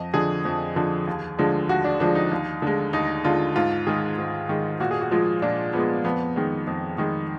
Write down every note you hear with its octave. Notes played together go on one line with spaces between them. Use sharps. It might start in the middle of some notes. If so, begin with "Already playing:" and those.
Already playing: F2 D#5
D3 F3 G#4
F2
D3 F3
D#2
D3 F3 G#3
D#2 F#4
D4
D3 F3 G#3 D4
D#4
D#2
D3 G#3
D#2 D#4
D3 G#3 F4
G#2 F4
D#3 G#3 G#4
G#2
D#3 G#3
A#2 F#4
G#4
F#4
F3 G#3 F4
A#2 D4
F3 G#3 B3
F2 B3
D#3 G#3
F2
D#3 G#3